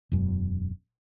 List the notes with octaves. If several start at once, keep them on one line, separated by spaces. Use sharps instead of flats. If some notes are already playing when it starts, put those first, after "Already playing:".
E1 F#2